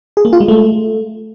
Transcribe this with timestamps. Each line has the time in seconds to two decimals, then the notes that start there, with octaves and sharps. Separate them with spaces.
0.17 G#4
0.25 A#3
0.33 F4
0.40 G#3
0.48 A3